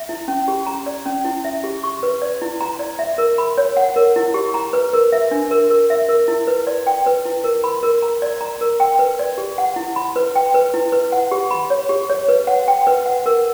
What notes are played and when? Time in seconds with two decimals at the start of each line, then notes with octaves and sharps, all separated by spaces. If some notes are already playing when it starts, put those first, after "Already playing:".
Already playing: E5
0.09 E4
0.28 C#4
0.48 G4
0.66 A#5
0.86 D5
1.05 C#4
1.25 E4
1.45 E5
1.64 G4
1.83 C#6
2.03 B4
2.22 D5
2.42 E4
2.61 A#5
2.79 D5
2.99 E5
3.18 A#4
3.38 B5
3.58 C#5
3.77 F#5
3.96 A#4
4.16 E4
4.34 G4
4.54 A#5
4.73 B4
4.93 A#4
5.12 E5
5.31 D4
5.51 A#4
5.70 A#4
5.90 E5
6.09 A#4
6.28 E4
6.47 B4
6.67 D5
6.87 G5
7.06 B4
7.25 E4
7.44 A#4
7.64 B5
7.83 A#4
8.02 A#5
8.22 D5
8.41 A#5
8.61 A#4
8.80 G5
8.99 B4
9.19 D5
9.38 G4
9.58 F#5
9.76 E4
9.96 B5
10.16 B4
10.35 G5
10.54 B4
10.74 E4
10.92 B4
11.12 F#5
11.31 G4
11.51 B5
11.70 C#5
11.89 G4
12.10 C#5
12.28 B4
12.47 F#5
12.68 G5
12.87 B4
13.06 F#5
13.26 A#4